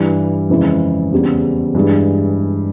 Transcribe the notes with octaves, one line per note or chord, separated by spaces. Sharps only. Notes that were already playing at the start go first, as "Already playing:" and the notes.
Already playing: G2 E3 G3
F2 C#3 E3 G#3 E4
E2 C#3 G3 C4
G2 E3 G#3